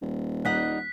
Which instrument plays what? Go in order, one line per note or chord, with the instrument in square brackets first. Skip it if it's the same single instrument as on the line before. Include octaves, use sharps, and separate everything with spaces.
[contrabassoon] D#1
[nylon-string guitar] G3 D#4 F#5 [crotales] F#6 B6